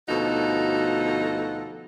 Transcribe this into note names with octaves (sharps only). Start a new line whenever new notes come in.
D2 B2 F3 D#4 F#4 A4